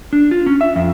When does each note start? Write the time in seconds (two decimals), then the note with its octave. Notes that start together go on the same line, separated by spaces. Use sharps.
0.13 D4
0.31 F4
0.46 C#4
0.61 E5
0.76 F2